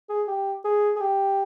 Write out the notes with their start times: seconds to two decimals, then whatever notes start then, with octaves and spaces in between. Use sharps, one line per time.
0.10 G#4
0.28 G4
0.65 G#4
0.96 G#4
1.01 G4